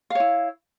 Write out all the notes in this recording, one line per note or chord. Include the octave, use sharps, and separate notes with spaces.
E4 C#5 F5